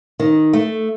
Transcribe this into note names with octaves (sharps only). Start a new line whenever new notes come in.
D#3
A3